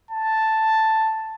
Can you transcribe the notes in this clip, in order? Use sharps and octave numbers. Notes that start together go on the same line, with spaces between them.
A5